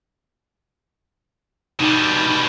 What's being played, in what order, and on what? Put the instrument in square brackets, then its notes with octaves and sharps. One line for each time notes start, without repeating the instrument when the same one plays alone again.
[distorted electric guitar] B2 G3 [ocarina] D#4